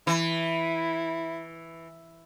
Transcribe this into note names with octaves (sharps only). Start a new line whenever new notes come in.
E3 E4